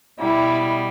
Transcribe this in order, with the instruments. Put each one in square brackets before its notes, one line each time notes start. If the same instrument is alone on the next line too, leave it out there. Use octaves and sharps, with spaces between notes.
[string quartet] B2 G3 E4